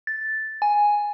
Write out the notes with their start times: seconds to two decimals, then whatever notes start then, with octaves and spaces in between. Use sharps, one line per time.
0.07 A6
0.62 G#5